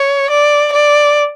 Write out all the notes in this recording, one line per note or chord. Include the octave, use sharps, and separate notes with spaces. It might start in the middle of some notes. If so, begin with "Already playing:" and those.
Already playing: C#5
D5
D5